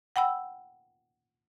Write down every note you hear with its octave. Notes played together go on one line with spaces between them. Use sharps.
F#5 G5 B5 E6